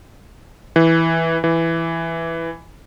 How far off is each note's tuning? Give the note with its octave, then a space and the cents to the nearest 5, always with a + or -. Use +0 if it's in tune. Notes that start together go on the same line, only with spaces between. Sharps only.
E3 -5
E3 +5